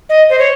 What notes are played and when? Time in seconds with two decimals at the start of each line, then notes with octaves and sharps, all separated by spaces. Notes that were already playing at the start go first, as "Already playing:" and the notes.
0.09 D#5
0.30 C5
0.39 C#5